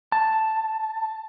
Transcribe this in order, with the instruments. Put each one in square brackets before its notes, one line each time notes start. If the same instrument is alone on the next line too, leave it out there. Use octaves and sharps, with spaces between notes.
[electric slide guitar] A5